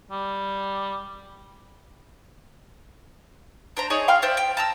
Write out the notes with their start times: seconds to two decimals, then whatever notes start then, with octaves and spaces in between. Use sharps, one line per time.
0.11 G3
3.77 D4 C5 A#5
3.90 D#4 G#4 C#5 D5
4.08 F5 G5 C6 F6
4.22 C5 D5 E5
4.37 G5
4.57 A5 A#5 E6